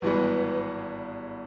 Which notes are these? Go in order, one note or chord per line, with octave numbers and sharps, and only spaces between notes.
G#1 G2 E3 G#3 B3 B4